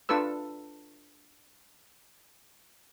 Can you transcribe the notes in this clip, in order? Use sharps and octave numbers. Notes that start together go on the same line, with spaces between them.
D4 F4 A4 B4 E6